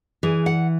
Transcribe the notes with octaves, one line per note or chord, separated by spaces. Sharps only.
E3 G#4
F#5